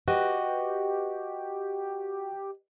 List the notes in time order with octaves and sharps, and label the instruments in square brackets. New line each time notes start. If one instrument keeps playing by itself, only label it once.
[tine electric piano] F#4 [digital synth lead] G4 [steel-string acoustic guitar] B4 D#5 G5